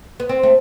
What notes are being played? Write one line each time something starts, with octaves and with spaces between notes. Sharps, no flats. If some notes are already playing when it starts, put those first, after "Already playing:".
B3
C4
A3